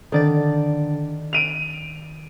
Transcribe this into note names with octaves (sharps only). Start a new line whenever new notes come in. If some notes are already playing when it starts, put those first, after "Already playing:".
D3 D#3 D5 A6
D7 D#7 F7